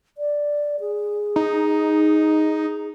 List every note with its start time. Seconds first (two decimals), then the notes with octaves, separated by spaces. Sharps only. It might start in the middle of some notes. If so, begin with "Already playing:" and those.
0.18 D5
0.80 G#4
1.36 D#4